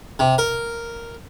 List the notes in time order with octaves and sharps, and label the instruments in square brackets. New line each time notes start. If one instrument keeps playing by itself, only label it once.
[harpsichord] C3
A#4